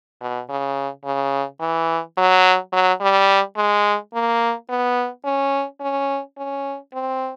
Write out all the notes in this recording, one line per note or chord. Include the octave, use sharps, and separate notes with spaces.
B2
C#3
C#3
E3
F#3
F#3
G3
G#3
A#3
B3
C#4
C#4
C#4
C4